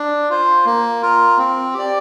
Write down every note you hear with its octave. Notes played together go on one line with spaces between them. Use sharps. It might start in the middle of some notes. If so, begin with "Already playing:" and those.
Already playing: D4
F4 C5
A#3
F4 A#4
C4
G4 D5